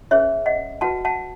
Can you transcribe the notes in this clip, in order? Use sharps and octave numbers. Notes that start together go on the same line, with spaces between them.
C#4 G#4 B4 C#5 E5
D#5 F#5
F#4 B4 F#5 A5
F#5 A5